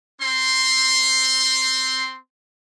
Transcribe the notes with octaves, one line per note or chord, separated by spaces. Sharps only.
C4 C6